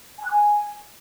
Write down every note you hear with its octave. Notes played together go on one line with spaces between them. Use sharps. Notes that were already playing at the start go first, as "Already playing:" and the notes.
G#5
F#6
G#5